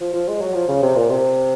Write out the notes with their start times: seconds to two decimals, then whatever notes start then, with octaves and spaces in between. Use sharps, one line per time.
0.01 F3
0.13 F3
0.28 G#3
0.41 F#3
0.54 F3
0.68 C#3
0.83 C3
0.96 A#2
1.10 C3